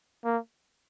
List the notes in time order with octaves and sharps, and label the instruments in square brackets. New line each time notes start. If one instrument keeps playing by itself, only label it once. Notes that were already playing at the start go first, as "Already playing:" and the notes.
[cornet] A#3